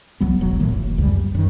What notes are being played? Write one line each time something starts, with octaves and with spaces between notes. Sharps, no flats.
C2 F#3 B3
E1 B1 F#3
B1 A2 D#3 A#3
F1
C#2 F#2 C#3 G3
F#2 D#3